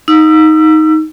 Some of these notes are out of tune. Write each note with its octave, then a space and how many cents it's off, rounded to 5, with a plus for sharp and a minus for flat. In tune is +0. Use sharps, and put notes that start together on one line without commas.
D#4 +10 E6 +30